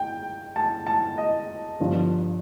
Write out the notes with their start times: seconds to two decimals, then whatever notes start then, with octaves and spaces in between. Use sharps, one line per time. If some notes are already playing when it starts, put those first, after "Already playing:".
Already playing: G5
0.56 A5
0.87 A5
1.18 D#5
1.80 G1 G2 D3 F3